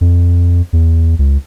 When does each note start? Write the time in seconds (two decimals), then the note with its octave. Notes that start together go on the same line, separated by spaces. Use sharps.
0.01 F2
0.73 E2
1.19 C#2